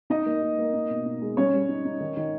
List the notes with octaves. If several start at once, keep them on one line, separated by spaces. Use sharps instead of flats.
D#4 D#5
A#3
D#4
A#3
D#4
B2
D#4
G#3
G3 C#4 C#5
G3
D#4
D#4
D#3
D#3